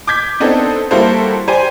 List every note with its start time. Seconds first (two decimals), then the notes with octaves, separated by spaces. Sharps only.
0.07 D6 G6 G#6 B6
0.40 B3 C4 D4 D#4 A4
0.91 G3 A#3 E4 F#4 A4 C5
1.48 G4 C5 D5 G#5